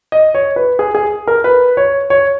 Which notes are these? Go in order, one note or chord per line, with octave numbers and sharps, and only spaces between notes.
D#5
C#5
B4
G#4
G#4
A#4
B4
C#5
C#5